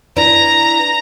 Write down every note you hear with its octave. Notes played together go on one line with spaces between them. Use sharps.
D4 E4 B4 A#5